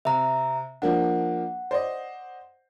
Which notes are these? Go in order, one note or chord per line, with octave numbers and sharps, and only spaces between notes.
C3 E5 A#5
F3 A#3 D4 F#5
C5 D5 D#5